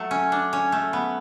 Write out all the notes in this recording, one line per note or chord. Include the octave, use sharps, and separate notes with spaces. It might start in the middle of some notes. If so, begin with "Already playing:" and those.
Already playing: F#3 A3
C#4
D4
C#4
A3
B3